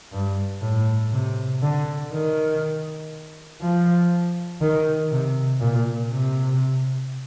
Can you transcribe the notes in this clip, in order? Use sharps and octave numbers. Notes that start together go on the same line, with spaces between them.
G2
A2
C3
D3
D#3
F3
D#3
C3
A#2
C3